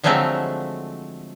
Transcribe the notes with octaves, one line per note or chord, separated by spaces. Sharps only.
D3 F3 F#3 G#3 A3 C4